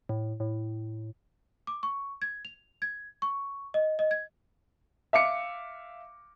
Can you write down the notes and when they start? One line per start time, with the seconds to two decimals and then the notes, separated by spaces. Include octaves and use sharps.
0.09 A2
0.40 A2
1.67 D6
1.83 C#6
2.22 G#6
2.45 F7
2.82 G#6
3.22 C#6
3.74 D#5
3.99 D#5
4.11 G#6
5.13 E5 F5 D6 C#7